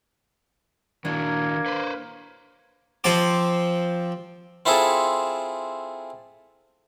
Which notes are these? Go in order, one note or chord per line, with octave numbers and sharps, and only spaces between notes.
D#3 A#3 D4 E4 F#4 G#6
B4 C5
F3 C4 G#5 A5 D6
C4 E4 F4 G#4 A4